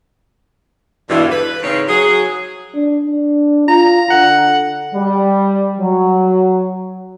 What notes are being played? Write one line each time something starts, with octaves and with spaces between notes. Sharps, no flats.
E2 G2 B2 D3 E3
B4
G#2 C#3 C4 C#5
F#3 G#4
D4
D4
F4 A#5
D3 F#5
G3
F#3